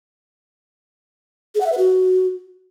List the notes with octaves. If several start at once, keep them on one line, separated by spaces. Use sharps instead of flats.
G#4
F#5
E5
B4
F#4